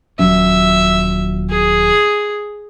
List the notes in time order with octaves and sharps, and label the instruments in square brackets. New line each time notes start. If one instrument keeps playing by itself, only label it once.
[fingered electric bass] D#1 F#3 C#4 [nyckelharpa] E5
[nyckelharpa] G#4